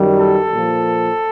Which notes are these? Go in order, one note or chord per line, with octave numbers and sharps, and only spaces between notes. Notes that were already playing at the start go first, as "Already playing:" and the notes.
Already playing: F#2 D#3 G3
A4
A#2 F3